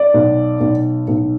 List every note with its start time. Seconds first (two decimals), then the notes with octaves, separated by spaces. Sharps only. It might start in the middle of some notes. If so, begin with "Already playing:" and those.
Already playing: D5
0.14 B1
0.60 B1
1.08 B1